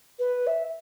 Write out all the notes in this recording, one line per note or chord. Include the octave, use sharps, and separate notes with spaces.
B4
E5